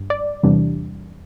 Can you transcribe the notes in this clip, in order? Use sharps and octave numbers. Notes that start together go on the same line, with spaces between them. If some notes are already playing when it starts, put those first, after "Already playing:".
Already playing: G2
D5
E2 C3 E3 G3 D4